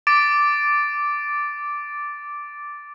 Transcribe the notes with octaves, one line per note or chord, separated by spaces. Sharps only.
D6 A6 D7